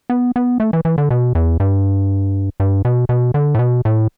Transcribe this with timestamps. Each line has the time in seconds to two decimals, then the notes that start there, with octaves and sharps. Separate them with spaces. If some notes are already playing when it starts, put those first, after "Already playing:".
0.10 B3
0.36 B3
0.60 A3
0.73 E3
0.85 E3
0.98 D3
1.11 B2
1.35 E2
1.60 G2
2.60 G2
2.85 B2
3.09 B2
3.34 D3
3.55 A2
3.59 B2
3.85 A2